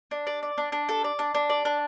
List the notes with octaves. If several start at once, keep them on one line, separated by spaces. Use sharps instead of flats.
D4
D5
D5
D4
D4
A4
D5
D4
D4
D5
D4